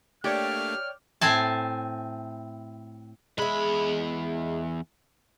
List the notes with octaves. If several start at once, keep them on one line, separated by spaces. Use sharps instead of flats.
A3 A#3 D4 G4 C#5 D5 G5 F6
A2 C4 G#5 A5
E2 G#3 E4 B5